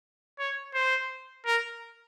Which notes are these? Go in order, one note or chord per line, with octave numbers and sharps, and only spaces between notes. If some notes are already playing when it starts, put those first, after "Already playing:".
C#5
C5
A#4